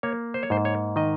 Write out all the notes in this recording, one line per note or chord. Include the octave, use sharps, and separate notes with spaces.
A#3 C#5
C5
C#5
G#2 C5
C#5
D#3 D#5